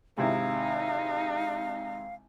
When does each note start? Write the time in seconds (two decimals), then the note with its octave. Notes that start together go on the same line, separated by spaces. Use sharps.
0.18 G#1 C3 D#4 E4 F5